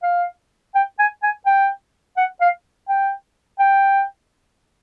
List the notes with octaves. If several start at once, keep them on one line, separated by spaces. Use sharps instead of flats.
F5
G5
G#5
G#5
G5
F#5
F5
G5
G5